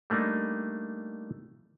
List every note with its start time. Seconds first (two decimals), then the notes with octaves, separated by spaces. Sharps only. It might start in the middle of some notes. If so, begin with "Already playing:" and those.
0.10 G3 A3 A#3 D4 D#4